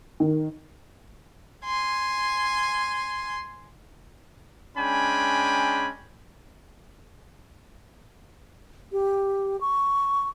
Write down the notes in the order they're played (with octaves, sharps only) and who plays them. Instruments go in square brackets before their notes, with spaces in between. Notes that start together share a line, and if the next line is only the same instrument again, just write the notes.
[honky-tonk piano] D#3
[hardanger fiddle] G#5 C6
[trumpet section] G#3 C#4 D4 G5 G#5 B5
[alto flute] G4
C#6